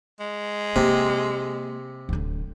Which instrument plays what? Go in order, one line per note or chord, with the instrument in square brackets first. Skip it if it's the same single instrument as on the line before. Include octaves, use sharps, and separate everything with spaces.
[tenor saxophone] G#3
[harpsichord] C3 [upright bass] A#3
[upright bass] D1 D3